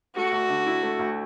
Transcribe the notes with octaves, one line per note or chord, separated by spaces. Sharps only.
A3 F#4
D2
D3
E4
A3
D2